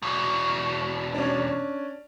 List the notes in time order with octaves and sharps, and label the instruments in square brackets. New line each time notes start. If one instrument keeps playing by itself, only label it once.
[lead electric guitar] E2 B2
[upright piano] C#4 D4